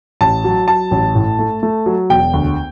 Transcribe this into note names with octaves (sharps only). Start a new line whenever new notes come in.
A1 A5
F#3
F#3 A5
A1
A2
A3
A3
F#3
E1 G5
D2